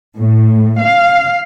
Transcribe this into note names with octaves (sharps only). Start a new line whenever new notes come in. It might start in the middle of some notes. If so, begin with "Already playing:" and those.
A2
F5